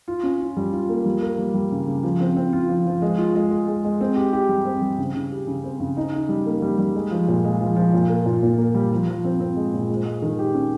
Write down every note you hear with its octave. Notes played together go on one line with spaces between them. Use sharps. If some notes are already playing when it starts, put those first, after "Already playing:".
F4
C#4
F4
G3
F4
A#3
G3
A#3
G3
G3
C#3
C#3
F3
C4
C4
F4
F3
F3
G#3
F4
G#3
G#3
G#3
G#3
C4
G4
G4
G3
C4
G3
C#3
C#3
G4
C#3
C4
C#3
D#4
D#4
G3
A#3
G3
G3
G#3
F3
A#2
G#3
F3
F3
A#2
A#3
A#2
A#2
A#3
G3
F3
F3
C4
C4
G#3
A#2
G#3
G#3
D#3
G4
C#4